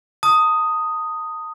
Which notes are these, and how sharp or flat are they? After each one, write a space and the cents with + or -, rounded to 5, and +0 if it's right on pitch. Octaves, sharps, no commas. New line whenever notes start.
A5 +45 D#6 +0